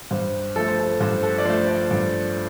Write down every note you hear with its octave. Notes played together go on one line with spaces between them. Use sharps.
G2 C5
F3 A3 A4
C5
A4
G2 C5
A4
D5
F3 A3 C5
D5
G2 D5